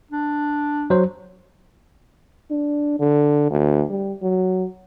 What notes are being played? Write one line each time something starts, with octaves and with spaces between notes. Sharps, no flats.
D4
F#3 C5
D4
D3
D2
G3
F#3